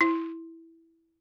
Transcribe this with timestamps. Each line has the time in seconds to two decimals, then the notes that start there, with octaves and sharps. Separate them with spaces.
0.01 E4